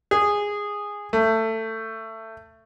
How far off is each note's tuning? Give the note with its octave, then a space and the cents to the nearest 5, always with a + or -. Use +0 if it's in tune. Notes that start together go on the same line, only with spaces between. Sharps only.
G#4 -10
A3 +20